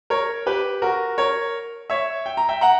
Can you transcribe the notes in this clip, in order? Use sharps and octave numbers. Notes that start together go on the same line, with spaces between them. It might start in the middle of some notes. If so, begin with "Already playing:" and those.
A#4 C#5
G4 B4
F#4 A#4
A#4 C#5
C#5 E5
G5
A#5
E5 G5
F#5 A#5